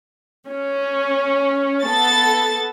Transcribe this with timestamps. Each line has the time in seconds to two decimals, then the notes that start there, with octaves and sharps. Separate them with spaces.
0.48 C#4
1.84 B3 A4 A6